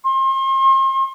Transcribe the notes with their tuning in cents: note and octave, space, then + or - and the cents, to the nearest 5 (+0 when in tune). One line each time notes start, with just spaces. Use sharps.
C6 +40